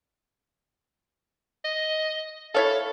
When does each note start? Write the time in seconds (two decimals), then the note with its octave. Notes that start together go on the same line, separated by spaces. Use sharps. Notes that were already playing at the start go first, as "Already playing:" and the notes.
1.65 D#5
2.55 E4 A4 C#5 F5